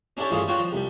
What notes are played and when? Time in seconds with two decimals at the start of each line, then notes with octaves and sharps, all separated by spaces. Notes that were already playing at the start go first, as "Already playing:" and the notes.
0.17 C#4 D4 E4 G4 A4 C#5
0.31 A1 G2 E3 C#4 F4 G#4
0.47 D4 F4 F#4 C#5 F#5 G5
0.59 F3
0.72 C2 G3